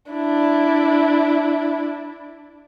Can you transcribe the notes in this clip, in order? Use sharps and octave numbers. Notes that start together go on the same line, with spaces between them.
D4 E4